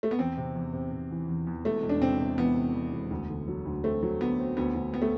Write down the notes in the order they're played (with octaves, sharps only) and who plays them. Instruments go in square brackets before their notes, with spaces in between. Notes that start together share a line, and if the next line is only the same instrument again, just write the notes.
[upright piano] A3
B3
[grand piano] E2 [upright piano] C4
[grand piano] C3
E2
C3
C3
E3
E2
E2
[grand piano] E1 [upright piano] A3
[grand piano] E1
[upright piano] D4
[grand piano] C3 [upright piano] C4
[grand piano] C3
[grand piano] E3 [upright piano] B3
[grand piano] C3
E3
E1
D2
D3
F#3
D2
[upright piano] A3 [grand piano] C4
[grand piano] F#3
[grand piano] D2 [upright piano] B3
[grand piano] C4
[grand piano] D2 [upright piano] B3
[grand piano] D2
[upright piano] B3 [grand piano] C4
[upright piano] A3